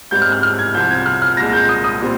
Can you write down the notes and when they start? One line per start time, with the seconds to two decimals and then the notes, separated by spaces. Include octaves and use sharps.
0.11 G#2 G3 C4 G6
0.22 F6
0.32 F6
0.43 F6
0.58 G#6
0.74 C2 C3 F3 C4 G6
0.90 G#6
1.06 F6
1.22 F6
1.37 C2 A#2 G#3 A#6
1.53 G6
1.69 D#6
1.84 D#6
2.02 A#2 G3 C4